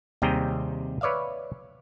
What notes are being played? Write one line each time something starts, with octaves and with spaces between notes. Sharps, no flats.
D#2 C3 G3 G#4 G5 A#5
B4 C#5 D5 E5 F5